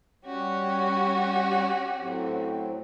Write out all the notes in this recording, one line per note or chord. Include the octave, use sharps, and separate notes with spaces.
G3 C#4 F#4 G4 C#5
A2 F#3 C4